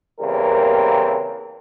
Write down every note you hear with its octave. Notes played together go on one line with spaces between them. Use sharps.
E2 C#3 G3 A#3 C4 A#4